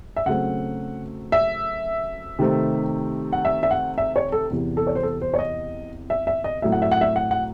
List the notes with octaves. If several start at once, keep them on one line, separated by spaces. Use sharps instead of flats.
E5
C#3 F#3 A3 C4 F#5
E5
C3 D#3 A3 C4
F#5
E5
E5
F#5
E5
C#5
A4
E2 C3 E3
A4
C#5
C5
A4
C5
C#5
D#5
E5
E5
D#5
A2 F#3 A3 C4 E5
F#5
E5
F#5
E5
F#5
F#5